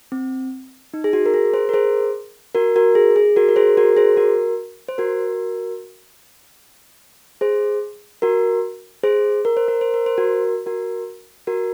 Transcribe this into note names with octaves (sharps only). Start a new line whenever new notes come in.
C4
D#4
G#4
F#4
A#4
G#4
G#4 C5
A#4
G#4 C5
F#4 A#4
F#4 A#4
G#4
G#4
F#4 A#4
A#4
G#4 C5
F#4 A#4
G#4 C5
F#4 A#4
C5
F#4 A#4
G#4 C5
F#4 A#4
G#4 C5
A#4
C5
A#4
C5
A#4
C5
F#4 A#4
F#4 A#4
F#4 A#4